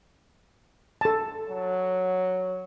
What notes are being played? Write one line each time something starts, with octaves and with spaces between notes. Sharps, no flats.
A4 A5
F#3